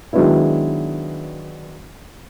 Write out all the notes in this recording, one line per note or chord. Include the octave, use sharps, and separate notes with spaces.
D#3 F#3 G#3 B3 D4 E4